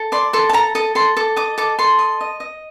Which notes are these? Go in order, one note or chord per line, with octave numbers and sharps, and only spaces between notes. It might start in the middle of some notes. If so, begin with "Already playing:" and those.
Already playing: A4
D5 C6
A4 C6
A5
A4 A#5
A4 D#5
A4 C6
A4 D6
D#5 D6
A4 D6
A4 C6
D#5
D#5
D#5